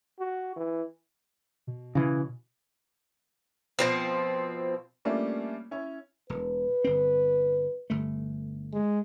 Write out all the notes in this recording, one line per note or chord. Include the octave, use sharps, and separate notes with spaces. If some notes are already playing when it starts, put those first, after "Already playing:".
F#4
E3
B2
C#3 E3
B2 F3 C4
G3 A3 A#3 C#4 D4 F4
C#4 E4 C#5
E1 B4
G1 C4
G1 A3
G#3